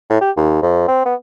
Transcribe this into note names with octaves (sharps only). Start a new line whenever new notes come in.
A2
G4
D#2
F2
C4
B3